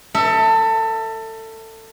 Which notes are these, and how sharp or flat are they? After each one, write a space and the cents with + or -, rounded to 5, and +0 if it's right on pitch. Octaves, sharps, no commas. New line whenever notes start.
A4 +25 E5 -20